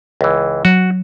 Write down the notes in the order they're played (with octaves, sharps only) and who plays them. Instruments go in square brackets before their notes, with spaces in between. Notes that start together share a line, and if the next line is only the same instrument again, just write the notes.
[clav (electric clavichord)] C#2 E3
[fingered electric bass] F#3 [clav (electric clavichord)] F#4